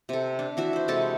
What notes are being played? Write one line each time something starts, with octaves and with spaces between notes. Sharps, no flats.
C3 A4
D4
E3 F#4 E5
E4 C5
C3 G#3 A4 A5